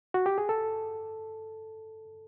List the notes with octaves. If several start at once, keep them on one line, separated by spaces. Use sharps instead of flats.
F#4
G4
G#4
A4